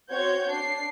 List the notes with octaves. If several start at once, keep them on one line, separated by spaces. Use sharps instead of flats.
C4 F#4 C#5 G6 G#6
D4 C7